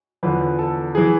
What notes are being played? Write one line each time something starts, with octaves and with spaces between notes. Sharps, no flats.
E2 D3 F3 B4
A4
E3 G#4